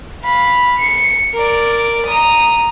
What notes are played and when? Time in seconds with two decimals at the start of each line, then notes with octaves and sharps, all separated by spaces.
0.23 F5 B5
0.78 C7 C#7
1.34 A#4 D5
2.06 A#5 D#6